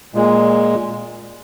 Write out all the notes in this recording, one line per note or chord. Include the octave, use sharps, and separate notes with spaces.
A#2 G#3